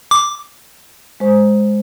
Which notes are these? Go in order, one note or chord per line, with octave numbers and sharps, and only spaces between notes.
D6
G#3 C5